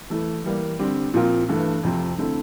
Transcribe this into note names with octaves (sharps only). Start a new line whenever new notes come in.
E3 A3 E4
E3 G3 A#3
D3 G3 C4 G4
A#2 F3 C4 F4 A#4
G2 E3 A3
F2 C3 F3 C4
D3 A3 C4 E4 A4